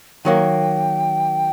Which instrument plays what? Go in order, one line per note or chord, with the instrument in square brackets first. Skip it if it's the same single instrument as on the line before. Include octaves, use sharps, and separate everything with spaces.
[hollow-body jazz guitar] D#3 F#3 A#3 [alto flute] G5